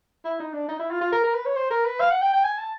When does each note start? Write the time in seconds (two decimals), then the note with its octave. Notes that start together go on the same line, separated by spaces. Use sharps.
0.25 E4
0.40 D#4
0.53 D4
0.68 D#4
0.79 E4
0.91 F4
1.01 F4
1.12 A#4
1.24 A#4
1.34 B4
1.46 C#5
1.55 C5
1.70 A#4
1.85 B4
2.00 F5
2.11 F#5
2.21 G5
2.33 G5
2.44 G#5
2.58 A5